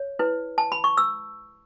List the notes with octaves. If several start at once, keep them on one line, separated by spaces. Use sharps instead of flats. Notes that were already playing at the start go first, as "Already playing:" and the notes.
Already playing: C#5
E4 B4
A5
B5
C#6
E6